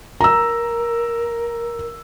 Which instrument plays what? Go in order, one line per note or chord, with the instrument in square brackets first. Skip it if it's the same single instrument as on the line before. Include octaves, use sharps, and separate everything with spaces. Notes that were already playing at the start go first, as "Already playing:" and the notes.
[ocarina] A#4 [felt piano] A#5 E6